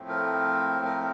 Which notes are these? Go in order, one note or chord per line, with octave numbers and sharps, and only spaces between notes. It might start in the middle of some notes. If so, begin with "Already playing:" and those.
Already playing: A2 F3 A3 C4
A#4
A#4